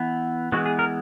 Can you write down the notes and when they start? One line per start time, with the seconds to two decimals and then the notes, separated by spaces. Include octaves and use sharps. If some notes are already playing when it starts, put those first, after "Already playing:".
Already playing: E3 B3
0.52 E3 G#3 B3 F#4
0.66 G#4
0.79 A#4